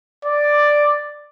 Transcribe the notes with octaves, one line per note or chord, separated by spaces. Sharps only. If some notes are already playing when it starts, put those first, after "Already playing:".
D5